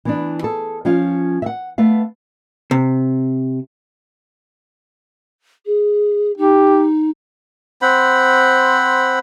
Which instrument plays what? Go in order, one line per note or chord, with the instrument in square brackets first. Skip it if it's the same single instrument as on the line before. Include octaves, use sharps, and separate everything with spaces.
[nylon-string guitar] E3 B3 D4
G#4 A4
F3 C#4 F4 F5
E5 F#5
A3 B3 F5
[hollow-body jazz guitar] C3
[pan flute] G#4
[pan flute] D#4 [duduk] G4
[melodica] C4 C5 F#5 B5